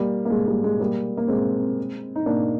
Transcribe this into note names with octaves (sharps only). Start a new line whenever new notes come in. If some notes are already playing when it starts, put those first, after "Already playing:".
Already playing: G3 A#3
A#3
G#3
G3 A#3
G#3
G3 A#3
A#3
G#3 C4
D#4
A#3 D4